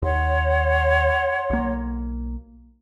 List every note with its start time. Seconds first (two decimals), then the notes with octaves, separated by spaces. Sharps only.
0.02 D#2 C#5 F#5 C6
1.50 B1 A#3